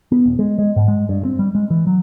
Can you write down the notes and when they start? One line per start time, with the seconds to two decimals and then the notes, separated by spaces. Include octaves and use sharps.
0.12 B3
0.25 D#1
0.39 G#3
0.58 G#3
0.76 G#2
0.88 G#3
1.09 G2
1.25 C4
1.39 G3
1.55 G#3
1.70 E3
1.87 F#3